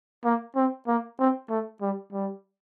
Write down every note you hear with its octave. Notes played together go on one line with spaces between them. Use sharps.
A#3
C4
A#3
C4
A3
G3
G3